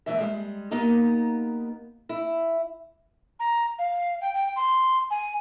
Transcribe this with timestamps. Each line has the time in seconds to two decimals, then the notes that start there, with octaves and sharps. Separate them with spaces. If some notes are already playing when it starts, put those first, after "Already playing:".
0.06 D#2 G#2 E3 E5
0.19 G3 G#3
0.71 A#3 B3 D#4 G4
2.09 E4
3.40 A#5
3.79 F5
4.21 G5
4.34 G5
4.56 C6
5.10 G#5